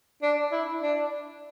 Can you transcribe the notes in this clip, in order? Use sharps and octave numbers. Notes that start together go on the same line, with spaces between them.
D4
E4
D4